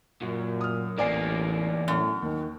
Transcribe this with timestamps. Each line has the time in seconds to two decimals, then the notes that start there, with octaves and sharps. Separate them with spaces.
0.21 F#2 A#2
0.61 D#6 F6
0.98 A1 E2 A#3 D5 G#5 C7
1.88 F#2 A2
2.22 D#2 D#3